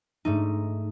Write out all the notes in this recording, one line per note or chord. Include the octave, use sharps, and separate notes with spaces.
G#2 A3 D#4